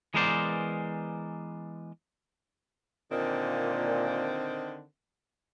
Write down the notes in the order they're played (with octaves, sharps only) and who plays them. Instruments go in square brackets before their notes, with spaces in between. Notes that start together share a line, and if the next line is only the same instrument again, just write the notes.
[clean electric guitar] E3 G#3 B3 A#4 C5 D5
[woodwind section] A#2 [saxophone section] D3 D#3 C4